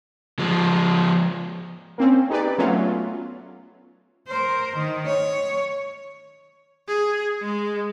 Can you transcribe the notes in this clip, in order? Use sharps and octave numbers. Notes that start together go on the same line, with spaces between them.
F3 G#3
A#3 C4 C#4
D#4 G4 G#4 B4 D5
F#3 A3 B3 C#4 F4
A#4 C5
D#3
C#5
G#4
G#3